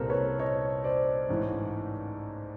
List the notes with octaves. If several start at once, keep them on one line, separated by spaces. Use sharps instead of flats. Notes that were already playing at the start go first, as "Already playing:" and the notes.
Already playing: C2 A#2 G3 C4 A4 A#4 C5
B4 C#5
C#5 D#5
C5 D5
A1 G#2 E3